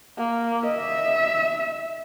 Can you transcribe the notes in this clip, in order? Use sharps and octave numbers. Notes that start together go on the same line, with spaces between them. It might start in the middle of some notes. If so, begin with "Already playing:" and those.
A#3
D#5 E5